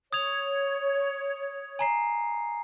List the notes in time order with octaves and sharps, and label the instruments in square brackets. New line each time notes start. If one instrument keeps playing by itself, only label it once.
[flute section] C#5 [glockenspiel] D#6 G#6 F7
[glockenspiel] G#5 A#5 C7